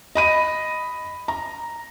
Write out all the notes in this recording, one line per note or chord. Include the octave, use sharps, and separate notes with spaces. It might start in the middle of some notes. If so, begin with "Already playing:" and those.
D#5 B5 D#7
A#5